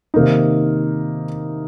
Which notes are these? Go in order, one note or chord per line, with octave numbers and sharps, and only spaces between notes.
C3 D#3 A#3 D#4